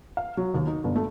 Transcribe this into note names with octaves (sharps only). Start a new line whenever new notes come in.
F5
F#3
D#2
D#4
G1
A3